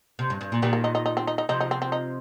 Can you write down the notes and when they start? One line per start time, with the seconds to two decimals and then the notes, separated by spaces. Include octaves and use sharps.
0.19 C3
0.30 G2
0.41 G2
0.52 A#2
0.62 A#2 D#3 G3
0.73 A#3
0.84 D#4
0.95 D#4
1.06 D#4
1.17 C4
1.27 D#4
1.38 D#4
1.49 C3 F3 D#4
1.60 D#4
1.71 C4
1.82 C4
1.92 D#4